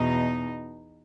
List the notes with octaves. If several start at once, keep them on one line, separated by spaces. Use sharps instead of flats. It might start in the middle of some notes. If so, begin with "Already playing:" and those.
Already playing: E2 B2 D#4